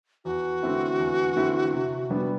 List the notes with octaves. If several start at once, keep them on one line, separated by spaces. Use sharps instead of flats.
E2 F#4
D3 A3 C4 E4
E2
D3 A3 C4 E4
C3
G3 B3 D4